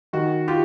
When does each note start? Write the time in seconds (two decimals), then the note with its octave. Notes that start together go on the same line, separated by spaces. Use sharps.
0.13 D#3 F#4
0.48 F4 G4